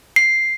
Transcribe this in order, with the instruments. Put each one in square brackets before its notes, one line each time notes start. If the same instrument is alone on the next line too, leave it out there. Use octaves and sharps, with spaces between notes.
[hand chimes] C7